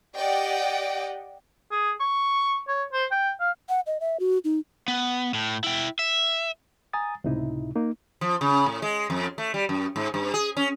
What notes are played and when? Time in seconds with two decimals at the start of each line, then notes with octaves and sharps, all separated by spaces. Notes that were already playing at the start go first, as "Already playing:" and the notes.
0.16 G4 D5 D#5 F#5 G5
1.71 G#4
2.01 C#6
2.68 C#5
2.93 C5
3.11 G5
3.40 F5
3.69 F#5
3.87 D#5
4.00 E5
4.20 F#4
4.44 D#4
4.88 B3
5.34 A2
5.64 E4 G5
5.99 E5
6.93 G#5 A#5 D#6 A6
7.24 C#2 A2 C3 D#4 E4
7.75 A#3 D#4
8.21 F3
8.41 C#3
8.66 A2
8.82 G#3
9.10 F2
9.38 A3
9.54 G3
9.69 F#2
9.96 G#2
10.14 G2
10.34 G#4
10.57 C#4